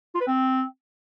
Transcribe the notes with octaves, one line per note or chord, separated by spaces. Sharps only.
F4
B4
C4